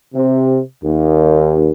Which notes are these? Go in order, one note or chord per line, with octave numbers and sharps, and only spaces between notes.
C3
D#2